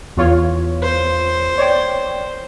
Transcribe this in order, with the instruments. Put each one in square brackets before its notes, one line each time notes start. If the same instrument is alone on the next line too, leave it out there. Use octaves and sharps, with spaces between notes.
[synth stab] E2 F4 C#5
[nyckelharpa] C5
[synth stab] C#5 D5 G5